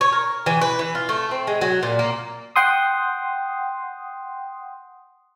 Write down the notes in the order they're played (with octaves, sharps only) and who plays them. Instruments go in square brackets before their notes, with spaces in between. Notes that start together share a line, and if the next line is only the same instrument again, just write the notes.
[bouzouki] C#5
A#4
E3
B4
E3
F4
A3
C4
G#3
F#3
A#2
A#3
[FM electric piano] F#5 G5 C6 D#6